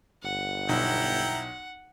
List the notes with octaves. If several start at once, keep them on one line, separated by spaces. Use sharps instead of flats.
G1 F#5
B1 E4 G5 A#5